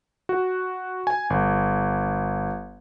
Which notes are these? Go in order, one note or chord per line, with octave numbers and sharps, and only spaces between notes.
F#4
G#5
G1